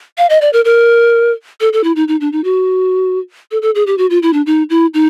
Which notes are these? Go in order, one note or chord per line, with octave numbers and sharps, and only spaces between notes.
F5
D#5
D5
A#4
A#4
A4
A4
E4
D#4
D#4
D4
D#4
F#4
A4
A4
G#4
G4
F#4
F4
E4
D4
D#4
E4
D#4